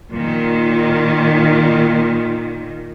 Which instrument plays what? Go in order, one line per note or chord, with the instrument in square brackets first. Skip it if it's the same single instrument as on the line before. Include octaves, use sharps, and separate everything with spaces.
[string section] A#2 D#3